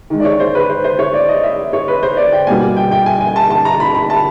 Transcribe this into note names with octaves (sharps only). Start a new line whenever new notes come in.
D#3 G#3
D5
C#5
C5
B4
C5
C5
C#5
D5
D#5
E5
C#5
B4
C5
D5
G5
B2 G3 A#3 G#5
G5
G5
G#5
G#5
A5
A5
A#5
B5
B5
A5